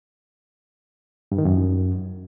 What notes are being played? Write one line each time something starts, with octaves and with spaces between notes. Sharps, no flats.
G2
D#3
F#2